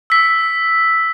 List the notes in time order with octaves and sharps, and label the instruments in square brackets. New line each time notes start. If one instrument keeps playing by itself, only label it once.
[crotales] E6 B6